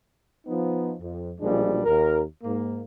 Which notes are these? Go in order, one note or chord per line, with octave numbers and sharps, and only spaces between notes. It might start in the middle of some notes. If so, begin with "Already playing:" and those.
F3 B3 D#4
F2
B1 A#2 F3 G3 G#3 D4
D#2 A#4
G#2 A#3